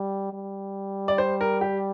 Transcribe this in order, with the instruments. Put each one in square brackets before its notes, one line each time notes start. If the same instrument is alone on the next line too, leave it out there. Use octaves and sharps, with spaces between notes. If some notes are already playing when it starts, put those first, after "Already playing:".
Already playing: [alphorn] G3
G3
[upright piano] D5
C5
A#4
G4